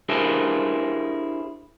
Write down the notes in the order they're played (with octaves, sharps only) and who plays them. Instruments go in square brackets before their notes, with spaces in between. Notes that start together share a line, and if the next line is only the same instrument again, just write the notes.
[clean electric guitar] D4 E4 G4 G#4 A#4 C5